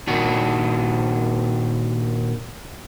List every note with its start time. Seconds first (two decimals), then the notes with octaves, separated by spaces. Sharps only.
0.07 A#2 D#3 D4 F#4